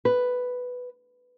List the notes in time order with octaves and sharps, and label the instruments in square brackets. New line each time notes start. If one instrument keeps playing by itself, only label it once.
[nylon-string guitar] B4